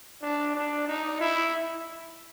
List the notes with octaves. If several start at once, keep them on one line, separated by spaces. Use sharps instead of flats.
D4
D4
D#4
E4